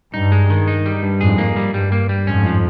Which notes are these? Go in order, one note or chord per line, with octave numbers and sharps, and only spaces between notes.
G2 D#4
G#3
D#3
D#4
G3
G2
F2 G#2 G#4
A#3
G3
G2 G3
A#3
G3
F2 G#2 C#4
F3